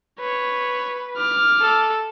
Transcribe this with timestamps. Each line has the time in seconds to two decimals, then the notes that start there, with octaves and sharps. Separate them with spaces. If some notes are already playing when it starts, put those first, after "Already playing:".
0.20 B4 C#5
1.17 D6 F6
1.62 A4